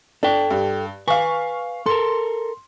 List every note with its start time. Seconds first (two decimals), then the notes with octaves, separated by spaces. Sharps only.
0.23 D4 A4 G5
0.51 G2
1.08 B4 F5 G#5 C#6
1.86 A4 A#4 C6